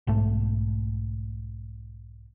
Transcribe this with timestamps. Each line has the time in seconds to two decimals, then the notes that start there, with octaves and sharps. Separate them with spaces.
0.07 B1 G#2 A3